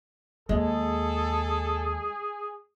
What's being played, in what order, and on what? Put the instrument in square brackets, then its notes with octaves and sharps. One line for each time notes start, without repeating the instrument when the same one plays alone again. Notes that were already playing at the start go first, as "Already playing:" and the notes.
[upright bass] D#2 [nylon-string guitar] G#3 [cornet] G#4 [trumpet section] A4